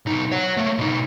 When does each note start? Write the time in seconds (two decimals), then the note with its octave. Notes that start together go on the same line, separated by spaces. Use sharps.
0.06 B1 D#4
0.32 C#5 F#5
0.57 A3 A#3
0.78 B2 D#4